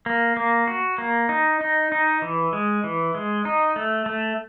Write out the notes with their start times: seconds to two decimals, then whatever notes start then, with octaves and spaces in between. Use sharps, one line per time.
0.06 A#3
0.37 A#3
0.67 F#4
0.98 A#3
1.29 D#4
1.61 D#4
1.92 D#4
2.22 E3
2.53 G#3
2.84 E3
3.15 G#3
3.45 D#4
3.76 A3
4.06 A3